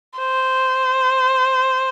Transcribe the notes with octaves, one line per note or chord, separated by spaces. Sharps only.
C5